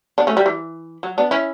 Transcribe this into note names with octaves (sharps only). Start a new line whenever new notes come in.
B3 D4
A3 C#4
G3
E3
F#3
B3 D4
C#4 E4